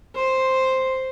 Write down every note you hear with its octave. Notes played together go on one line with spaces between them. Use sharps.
C5